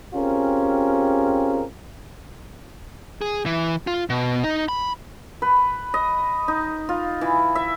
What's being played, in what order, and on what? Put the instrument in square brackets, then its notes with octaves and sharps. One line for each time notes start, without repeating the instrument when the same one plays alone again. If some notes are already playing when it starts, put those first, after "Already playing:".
[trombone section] C4 C#4 F4 G4 G#4 A#4
[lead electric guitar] G#4
E3
F4
B2
D#4
B5
[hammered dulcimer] B4
D#5
D#4
F4
E3
E5